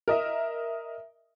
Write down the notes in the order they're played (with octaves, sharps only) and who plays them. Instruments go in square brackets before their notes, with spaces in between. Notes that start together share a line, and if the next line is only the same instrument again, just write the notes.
[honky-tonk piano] A#4 D#5 E5